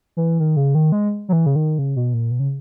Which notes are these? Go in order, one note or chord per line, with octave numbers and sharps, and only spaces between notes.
E3
D#3
C#3
D#3
G#3
F#3
E3
C#3
D#3
C#3
B2
A#2
B2
C#3